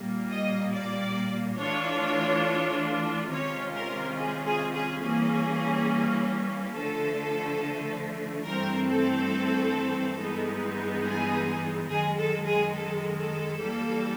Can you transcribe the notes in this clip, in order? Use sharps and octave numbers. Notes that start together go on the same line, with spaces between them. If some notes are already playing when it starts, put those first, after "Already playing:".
Already playing: A#2 G3 A#3
D#5
D5
E3 A3 D4 F4 C#5
C3 D#3 G#3 C#4 F4 C#5
A#4
G#4
G#4
G#4
E3 G3 A#3 C#4 G#4
D3 F3 A3 A4
G2 E3 A3 C4 A#4
A4
G2 E3 G#3 B3 D#4
G#4
F#2 D#3 G#3 G#4
A4
G#4
A4
A4
E3 G3 A#3